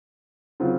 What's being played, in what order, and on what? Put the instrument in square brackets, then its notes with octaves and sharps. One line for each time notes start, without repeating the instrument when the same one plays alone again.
[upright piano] C#3 F#3 C4 F4